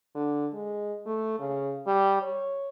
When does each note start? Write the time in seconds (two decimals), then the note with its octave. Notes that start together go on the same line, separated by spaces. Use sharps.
0.15 D3
0.54 G#3
1.06 A3
1.40 C#3
1.87 G3
2.22 C#5